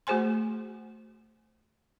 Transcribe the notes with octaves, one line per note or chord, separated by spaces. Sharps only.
A3 F#4 G#4 C5 G#5 C6